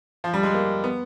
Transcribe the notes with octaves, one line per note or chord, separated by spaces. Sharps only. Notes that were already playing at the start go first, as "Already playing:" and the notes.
F3
G3
G#3
A#3
B3